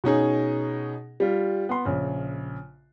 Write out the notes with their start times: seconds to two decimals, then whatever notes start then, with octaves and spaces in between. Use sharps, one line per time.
0.04 B2 C#4 D#4 G#4
1.20 G3 F4
1.69 B3 C6
1.85 A#1 C#3